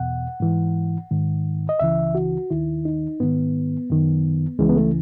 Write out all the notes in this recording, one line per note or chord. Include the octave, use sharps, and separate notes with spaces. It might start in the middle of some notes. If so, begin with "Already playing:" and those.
Already playing: E2 B2 F#5
G#2 E3
G#2 D#3
D#5
C#2 C#3 E3 E5
F#4
D#2 D#3 E4
D#4
G#2 D#3 B3
F#2 D#3
C#2 C#3 E3 G#3
B3
A3